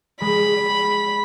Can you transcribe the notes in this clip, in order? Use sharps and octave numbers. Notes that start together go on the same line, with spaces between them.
G#3 B5